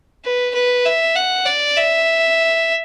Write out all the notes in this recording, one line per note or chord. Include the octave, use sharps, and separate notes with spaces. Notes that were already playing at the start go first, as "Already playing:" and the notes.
B4
B4
E5
F#5
D5
E5